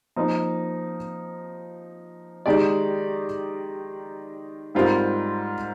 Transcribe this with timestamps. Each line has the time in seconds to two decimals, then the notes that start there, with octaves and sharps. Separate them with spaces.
0.16 F3 A#3 D#4
2.46 D#3 G#3 D#4 G4 D5
4.75 G#2 G3 C4 F4 A#4